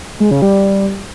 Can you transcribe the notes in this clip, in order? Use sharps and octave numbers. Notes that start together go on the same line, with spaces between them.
G#3
C#3
G3